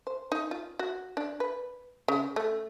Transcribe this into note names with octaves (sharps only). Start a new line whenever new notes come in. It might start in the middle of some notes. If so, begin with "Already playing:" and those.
C5
D#4
F4
F#4
D4
B4
C#3
A3